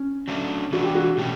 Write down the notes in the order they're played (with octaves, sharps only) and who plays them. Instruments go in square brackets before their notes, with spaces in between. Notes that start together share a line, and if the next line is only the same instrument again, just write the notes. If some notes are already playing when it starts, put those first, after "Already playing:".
Already playing: [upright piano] C#4
[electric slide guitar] D3 F#3 A3 D4
[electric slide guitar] E3 B3 D4 [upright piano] F#4
[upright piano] G4
F#4
[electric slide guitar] B2 A3 C#4 [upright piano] G4